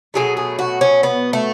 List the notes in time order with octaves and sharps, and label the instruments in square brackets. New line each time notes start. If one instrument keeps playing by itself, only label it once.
[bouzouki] B2 F#3 A3 G#4
G#4
F#4
C#4
B3
A3